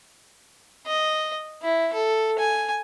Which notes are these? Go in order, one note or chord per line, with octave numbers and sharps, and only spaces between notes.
D#5
E4
A4
G#5